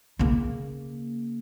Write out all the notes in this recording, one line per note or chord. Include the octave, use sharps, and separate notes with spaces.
C#3 A#3